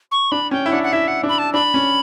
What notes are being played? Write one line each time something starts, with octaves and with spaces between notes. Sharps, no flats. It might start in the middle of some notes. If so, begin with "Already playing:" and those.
C#6
D4 B5
C#4 G5
E4
D4 F#5
F#5
E4 E5
F#5
D4
B5
A5
D4 B5
C#4